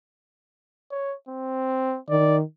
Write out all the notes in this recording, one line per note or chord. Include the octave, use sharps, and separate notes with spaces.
C#5
C4
D#3 D5